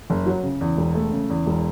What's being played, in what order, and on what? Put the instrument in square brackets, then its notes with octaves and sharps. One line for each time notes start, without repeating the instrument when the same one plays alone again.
[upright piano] F#1
F#3
C#3
E2
E1
A3
C#3
E2
E1